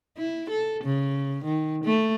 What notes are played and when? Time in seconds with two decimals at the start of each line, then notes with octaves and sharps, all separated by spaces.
0.18 E4
0.50 A4
0.84 C#3
1.44 D#3
1.84 A3